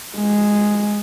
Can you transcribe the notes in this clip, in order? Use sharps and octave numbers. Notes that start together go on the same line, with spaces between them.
G#3